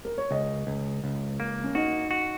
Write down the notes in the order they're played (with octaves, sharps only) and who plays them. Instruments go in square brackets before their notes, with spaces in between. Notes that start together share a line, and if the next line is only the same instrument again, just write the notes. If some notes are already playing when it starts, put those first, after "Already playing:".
[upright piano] A#4
C#5
[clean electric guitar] C#2 [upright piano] D#5
[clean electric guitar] C#2
C#2
A#3
[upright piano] C#4
[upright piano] D#4 [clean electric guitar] F#4
[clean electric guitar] F#4